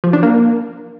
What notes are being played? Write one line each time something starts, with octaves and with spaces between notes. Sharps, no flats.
F3
D4
A#3